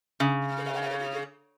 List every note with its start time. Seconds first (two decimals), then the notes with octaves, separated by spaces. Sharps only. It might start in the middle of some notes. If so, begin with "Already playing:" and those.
0.20 C#3